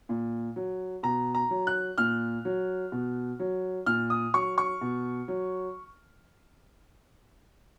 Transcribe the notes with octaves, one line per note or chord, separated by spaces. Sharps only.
A#2
F#3
B2 A#5
A#5
F#3
F#6
A#2 F6
F#3
B2
F#3
A#2 F6
D#6
F#3 C#6
C#6
B2
F#3